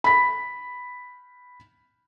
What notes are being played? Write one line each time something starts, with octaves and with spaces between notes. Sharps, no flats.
B5 B6